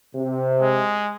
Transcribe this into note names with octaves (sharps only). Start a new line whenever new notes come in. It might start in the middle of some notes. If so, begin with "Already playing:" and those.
C3
G#3